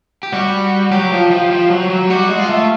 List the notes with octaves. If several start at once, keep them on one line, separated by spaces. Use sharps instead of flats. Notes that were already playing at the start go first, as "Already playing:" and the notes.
G4
G3 F#4
F#3 G4
F3
F3
F3
F#3
F#3
G3 F#4
G#3
F4
A3